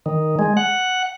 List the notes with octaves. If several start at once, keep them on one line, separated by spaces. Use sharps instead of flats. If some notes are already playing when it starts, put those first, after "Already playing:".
D#3
G#3
F#5